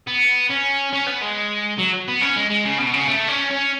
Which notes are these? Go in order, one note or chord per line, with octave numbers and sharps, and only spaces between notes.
B3
C#4
C#4
B3
G#3
F#3
B3
C#4
G#3
G#3
C#3
B2
C#3
A3
C#4
C#4